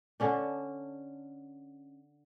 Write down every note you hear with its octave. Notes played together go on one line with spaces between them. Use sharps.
D3 C#4 D4